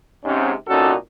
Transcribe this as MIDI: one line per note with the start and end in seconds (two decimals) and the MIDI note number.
0.24 0.51 44
0.24 0.51 48
0.24 0.51 61
0.68 0.93 36
0.68 0.93 46
0.68 0.93 61
0.68 0.93 63
0.68 0.93 66
0.68 0.93 69